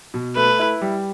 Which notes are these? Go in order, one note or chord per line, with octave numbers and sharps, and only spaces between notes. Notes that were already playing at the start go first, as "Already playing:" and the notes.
B2
A3 B4
E4
G3